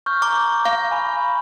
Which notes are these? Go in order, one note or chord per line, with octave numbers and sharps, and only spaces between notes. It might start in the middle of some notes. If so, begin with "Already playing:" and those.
C#6 F6 G6
A#5 D6
F5
G#5 B5 C#6